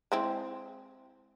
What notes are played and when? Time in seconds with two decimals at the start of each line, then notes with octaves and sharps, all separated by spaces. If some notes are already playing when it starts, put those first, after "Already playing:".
0.12 G#3 C4 E4